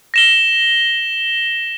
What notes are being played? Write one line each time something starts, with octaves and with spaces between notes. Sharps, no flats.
A#6 E7 G7